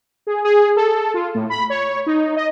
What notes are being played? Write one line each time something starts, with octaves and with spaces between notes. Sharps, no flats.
G#4
G#4
A4
F4
A2
B5
C#5
D#4
D#5